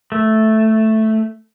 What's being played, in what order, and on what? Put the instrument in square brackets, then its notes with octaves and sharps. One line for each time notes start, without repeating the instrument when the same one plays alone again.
[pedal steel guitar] A3